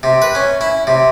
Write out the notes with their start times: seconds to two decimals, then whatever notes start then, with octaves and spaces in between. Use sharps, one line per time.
0.03 C3
0.22 B4
0.35 C#4
0.61 E4
0.87 C3